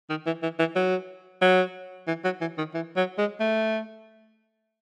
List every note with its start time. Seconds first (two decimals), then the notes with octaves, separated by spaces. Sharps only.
0.10 D#3
0.26 E3
0.43 E3
0.59 E3
0.76 F#3
1.42 F#3
2.07 E3
2.24 F#3
2.41 E3
2.58 D#3
2.74 E3
2.97 F#3
3.18 G#3
3.40 A3